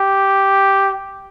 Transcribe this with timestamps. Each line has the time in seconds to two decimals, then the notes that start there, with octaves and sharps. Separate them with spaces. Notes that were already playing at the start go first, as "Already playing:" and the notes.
Already playing: G4